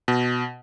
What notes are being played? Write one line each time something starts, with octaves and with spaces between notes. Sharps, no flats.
B2